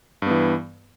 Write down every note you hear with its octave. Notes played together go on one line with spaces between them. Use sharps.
G2 E3 B3